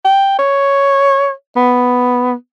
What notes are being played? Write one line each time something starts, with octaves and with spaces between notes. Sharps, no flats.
G5
C#5
B3